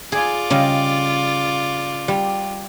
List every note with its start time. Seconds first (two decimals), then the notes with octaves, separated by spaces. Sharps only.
0.12 F4 G#4 D5
0.50 C#3 G3 D#5
2.08 G3